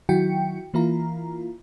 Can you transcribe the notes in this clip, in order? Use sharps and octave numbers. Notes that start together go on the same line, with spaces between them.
D#3 F#3 E4 F#4 G5 C#7
E3 A#3 E4 F4 A#5